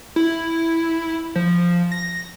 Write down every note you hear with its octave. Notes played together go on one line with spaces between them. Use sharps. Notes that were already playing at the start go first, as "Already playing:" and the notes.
E4
F3
A#6